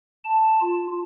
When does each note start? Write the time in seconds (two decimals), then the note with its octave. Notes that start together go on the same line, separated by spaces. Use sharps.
0.24 A5
0.61 F4